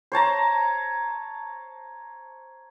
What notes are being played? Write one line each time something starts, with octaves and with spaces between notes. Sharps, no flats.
C5 C#5 A5 A#5